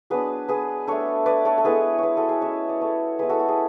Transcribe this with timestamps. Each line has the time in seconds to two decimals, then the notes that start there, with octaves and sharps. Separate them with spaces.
0.10 F#3 B3 D4 G#4 B4
0.48 G#4 B4
0.87 A3 D4 A4 C#5
1.26 B4 D5
1.45 A4 C#5
1.58 A4
1.65 G#3 B3 E4 G#4 B4
1.98 G#4 B4 C#5
2.17 F#4 A4
2.29 G#4
2.41 G#3 C#4 E4 C#5 E5
2.69 D5
2.81 A4 C#5
3.19 G#3 B3 E4 G#4 B4
3.29 F#4 A4
3.39 F#4
3.49 G#4